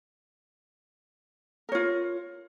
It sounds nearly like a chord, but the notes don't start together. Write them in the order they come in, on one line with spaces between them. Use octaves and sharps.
A#4 C#5 F4